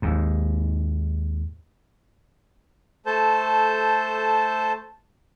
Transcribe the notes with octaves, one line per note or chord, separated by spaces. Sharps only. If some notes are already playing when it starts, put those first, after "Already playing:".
D#2 G#2
A3 A4 C5 A5 G6